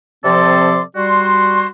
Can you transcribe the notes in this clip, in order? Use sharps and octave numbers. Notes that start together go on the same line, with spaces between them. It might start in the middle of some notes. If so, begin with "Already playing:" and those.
C3 F3 C4 A4 D5 C6
G3 F#4 C6